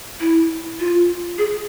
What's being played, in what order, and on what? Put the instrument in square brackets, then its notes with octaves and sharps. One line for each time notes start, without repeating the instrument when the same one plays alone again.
[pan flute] E4
F4
G#4